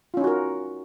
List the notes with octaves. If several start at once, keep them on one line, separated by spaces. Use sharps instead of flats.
C#4 D#4 F4 F#4 A#4